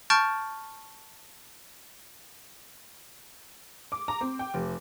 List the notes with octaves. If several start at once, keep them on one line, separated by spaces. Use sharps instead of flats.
A5 C#6 F6 G6 A6 D7
D6
A#5
C4
G5
F1